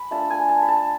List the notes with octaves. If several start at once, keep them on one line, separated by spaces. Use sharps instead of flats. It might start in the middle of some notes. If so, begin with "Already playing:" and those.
Already playing: B5
A3 D4 F4 A5
G#5
A5
B5
A5